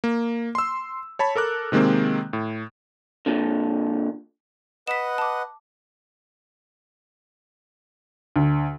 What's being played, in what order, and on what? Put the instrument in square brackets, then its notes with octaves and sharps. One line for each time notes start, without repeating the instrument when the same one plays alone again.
[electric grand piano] A#3
C6 E6
C#5 A5 B5
A4 A#4 D6 F#6
C3 D#3 G#3 A#3 C4
A2
[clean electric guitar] A#2 D3
[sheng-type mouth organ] B4 D#5 F#5 [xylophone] B6 E7
[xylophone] A5 D6
[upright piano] D2